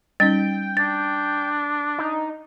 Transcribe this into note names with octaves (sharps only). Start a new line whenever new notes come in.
G3 C#4 D#4 G5 A6
D4 A6
D#4